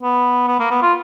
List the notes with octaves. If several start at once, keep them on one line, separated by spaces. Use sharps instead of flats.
B3
B3
A#3
B3
F4